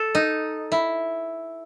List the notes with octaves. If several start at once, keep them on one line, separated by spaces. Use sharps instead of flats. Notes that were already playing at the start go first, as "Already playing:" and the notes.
Already playing: A4
D#4
E4